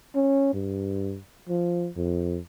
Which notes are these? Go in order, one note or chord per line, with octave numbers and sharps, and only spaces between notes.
C#4
G2
F3
F2